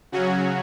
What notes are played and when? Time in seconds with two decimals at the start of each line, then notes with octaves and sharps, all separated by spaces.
0.12 C#3 F#3 C#4 F#4